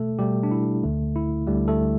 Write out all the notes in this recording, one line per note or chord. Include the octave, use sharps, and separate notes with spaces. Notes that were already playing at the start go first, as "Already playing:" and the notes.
Already playing: B2 A3 A4
B2 G3 A3 G4
D4
E4
D2 D3 A3
E4
D2 D3 G3 A3 G4
A3 A4